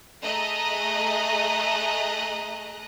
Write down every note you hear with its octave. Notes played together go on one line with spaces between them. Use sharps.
A3 G#4 D#5 A#5 F#6